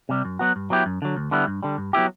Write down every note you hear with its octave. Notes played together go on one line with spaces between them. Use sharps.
C3 G3
F#2
F#3 B3 F#4
G2
F#3 B3 E4 G4
F#2
D3 F#3
D2
D3 G3 B3 E4
G2
D3 G3
G2
F#3 B3 E4 G4